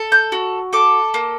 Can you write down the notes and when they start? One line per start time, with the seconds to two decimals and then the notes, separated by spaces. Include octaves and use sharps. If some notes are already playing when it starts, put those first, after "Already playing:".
Already playing: A4
0.12 G6
0.32 F#4
0.73 A4 D6
1.14 A#3